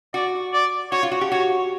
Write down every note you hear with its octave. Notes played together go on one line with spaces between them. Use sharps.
F#4 D5
D5
F#4 C#5
F4
F#4
G4
F#4 C#5